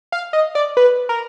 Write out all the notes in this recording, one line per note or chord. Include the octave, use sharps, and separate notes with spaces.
F5
D#5
D5
B4
A#4